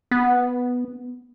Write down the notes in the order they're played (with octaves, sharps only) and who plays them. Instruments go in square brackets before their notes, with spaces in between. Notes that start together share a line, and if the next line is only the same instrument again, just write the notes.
[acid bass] B3